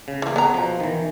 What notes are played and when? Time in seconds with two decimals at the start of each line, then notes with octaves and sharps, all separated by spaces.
0.08 C#3
0.22 E3 A#3
0.36 B3 A#5
0.54 B2 F3
0.80 D#3 E3